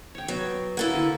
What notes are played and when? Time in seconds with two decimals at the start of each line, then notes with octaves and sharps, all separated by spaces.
0.15 C#5 G5
0.28 F#3 B3
0.77 A#3 E4 A4 F#5 G#5
0.94 D3